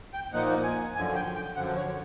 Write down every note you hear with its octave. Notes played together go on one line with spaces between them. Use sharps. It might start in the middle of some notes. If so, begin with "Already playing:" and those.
G5
A#2 F3 A#3 D#4 F#5
G#5
F#2 D3 F3 G#5
G5
G5
F#2 D3 F3 F#5
C#5